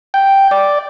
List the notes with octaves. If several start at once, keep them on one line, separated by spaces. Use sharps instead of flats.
G5
D5